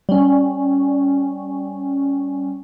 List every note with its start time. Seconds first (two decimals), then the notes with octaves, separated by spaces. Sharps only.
0.09 G3 C#4